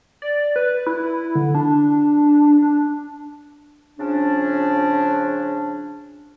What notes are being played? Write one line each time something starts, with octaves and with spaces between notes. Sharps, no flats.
D5
B4
E4
D3
D4
D4
C#3 F3 C#4 D4